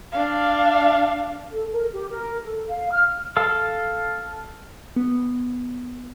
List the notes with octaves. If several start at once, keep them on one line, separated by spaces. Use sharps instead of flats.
D4 F5
A4
A#4
G4
A#4
A4
F5
F6
A4 F5 E6
B3